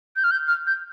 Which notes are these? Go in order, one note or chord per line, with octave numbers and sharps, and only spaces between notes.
G6
F6
G6
F6
G6